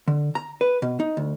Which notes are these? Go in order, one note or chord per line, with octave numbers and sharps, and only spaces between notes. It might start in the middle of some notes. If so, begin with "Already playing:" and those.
D3
A#5
B4
B2
D#4
D2